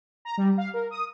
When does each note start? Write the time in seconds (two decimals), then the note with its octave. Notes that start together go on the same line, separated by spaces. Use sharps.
0.25 A#5
0.38 G3
0.58 F5
0.74 A#4
0.91 D#6